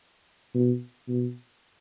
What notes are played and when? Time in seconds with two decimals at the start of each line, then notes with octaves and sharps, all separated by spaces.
0.54 B2
1.08 B2